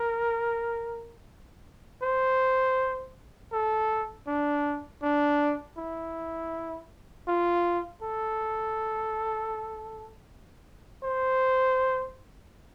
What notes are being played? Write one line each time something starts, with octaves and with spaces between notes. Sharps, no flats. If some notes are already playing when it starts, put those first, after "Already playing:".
Already playing: A#4
C5
A4
D4
D4
E4
F4
A4
C5